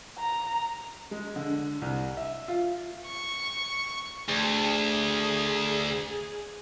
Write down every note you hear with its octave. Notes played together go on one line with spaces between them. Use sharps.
A#5
G#3
D3
C2
E5
F4
C#6
D2 G#4